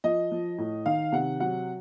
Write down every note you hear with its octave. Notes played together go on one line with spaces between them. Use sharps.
F3 D#5
F3
A2
D#3 F5
C3 F#5
F#3 F#5